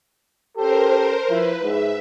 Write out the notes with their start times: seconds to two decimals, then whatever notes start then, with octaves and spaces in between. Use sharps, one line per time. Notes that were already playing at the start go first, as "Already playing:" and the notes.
0.57 C#4 G4 A4 A#4 C5
1.30 F3 E4 B4
1.63 G#2 E5